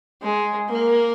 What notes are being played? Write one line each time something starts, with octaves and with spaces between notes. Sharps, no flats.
G#3
A#3